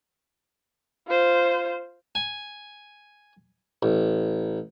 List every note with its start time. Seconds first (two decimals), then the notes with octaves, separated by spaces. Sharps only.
1.08 F4 C5
2.15 G#5
3.83 A1